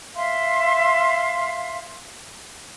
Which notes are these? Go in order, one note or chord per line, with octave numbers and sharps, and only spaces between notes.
E5 F5 C6